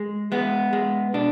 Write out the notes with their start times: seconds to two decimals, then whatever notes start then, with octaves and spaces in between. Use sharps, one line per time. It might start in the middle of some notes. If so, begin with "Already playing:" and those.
Already playing: G#3
0.32 G#3 B3
0.73 G#3
1.14 B2 D4